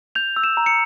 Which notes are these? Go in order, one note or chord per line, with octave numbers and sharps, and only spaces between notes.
G6 F7
E6
E7
A#5
C#7